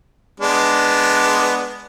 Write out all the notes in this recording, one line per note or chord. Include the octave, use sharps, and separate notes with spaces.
G#3 B3 D4